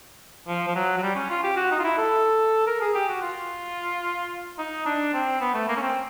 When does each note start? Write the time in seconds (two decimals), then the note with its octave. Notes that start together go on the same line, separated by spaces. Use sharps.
0.48 F3
0.68 F3
0.75 F#3
0.97 F#3
1.03 G3
1.15 C#4
1.30 F4
1.43 G4
1.57 F#4
1.71 D#4
1.79 F4
1.84 E4
1.98 A4
2.67 A#4
2.81 G#4
2.94 G4
3.08 F#4
3.22 F4
4.58 D#4
4.86 D4
5.14 C4
5.40 B3
5.54 A3
5.69 A#3
5.77 C#4
5.82 C4